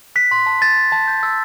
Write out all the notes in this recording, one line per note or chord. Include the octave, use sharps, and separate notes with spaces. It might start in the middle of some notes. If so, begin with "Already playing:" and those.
F#6 B6
C6
A5
A5 A6
A5
A5
G6
E6